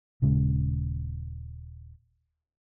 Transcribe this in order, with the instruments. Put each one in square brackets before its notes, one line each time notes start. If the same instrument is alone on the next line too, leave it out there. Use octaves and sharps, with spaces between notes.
[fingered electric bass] D#1 C#3 G#3